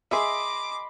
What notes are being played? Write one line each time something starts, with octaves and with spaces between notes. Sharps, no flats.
G#4 D#5 E5 B5 C6 D6